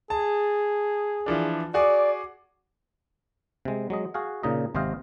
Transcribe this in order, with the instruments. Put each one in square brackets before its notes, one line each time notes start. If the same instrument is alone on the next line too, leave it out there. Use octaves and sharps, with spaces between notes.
[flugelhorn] G#4 [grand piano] A5
[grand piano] E3 F3 D4
[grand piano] F#4 G#4 D6 [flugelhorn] D5
[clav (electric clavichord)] C3 G#3
F#3 G#3 D#5
F#4 G#4 F5
A#2 C#3 D#4 D#5
G#1 C3 C5 D#5 F5